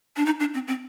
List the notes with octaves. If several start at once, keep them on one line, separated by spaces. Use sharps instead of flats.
D4
D#4
D4
C4
C4